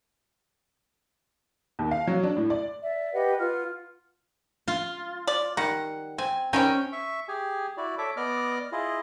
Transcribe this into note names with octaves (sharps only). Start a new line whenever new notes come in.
D#2
F5
F#3
D4
A2
D5
D5 E5
G4 B4 D#5 F#5
F4 B4 F#5 F6
F4
D5
D#3 G3 F#5
C4 G#5
D#3 G3 C4 C#4 G5 G#5
E5 C#6
G4 G#4 G#5
E4 F#4 D5
A4 C#5 E5 D6
B3 D5 D#5 D6 F6
E4 F4 G#4 D#5